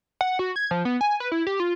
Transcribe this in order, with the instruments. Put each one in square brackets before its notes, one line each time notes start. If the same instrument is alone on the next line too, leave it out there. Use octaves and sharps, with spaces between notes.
[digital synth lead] F#5
F#4
G#6
F3
B3
G#5
B4
E4
G4
F4